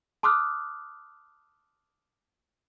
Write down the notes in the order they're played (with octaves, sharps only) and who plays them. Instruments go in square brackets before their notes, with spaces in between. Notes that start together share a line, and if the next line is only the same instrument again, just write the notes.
[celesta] A5 C6 D6 D#6 F6 F#6